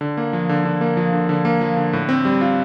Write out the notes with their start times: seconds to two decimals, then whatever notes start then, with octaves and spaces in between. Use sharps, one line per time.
0.01 D3
0.17 A#3
0.33 F3
0.49 D3
0.65 D3
0.81 A#3
0.97 F3
1.13 D3
1.29 D3
1.45 A#3
1.61 F3
1.77 D3
1.93 A2
2.09 C4
2.25 G3
2.41 F4